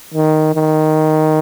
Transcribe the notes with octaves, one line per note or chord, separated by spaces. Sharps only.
D#3
D#3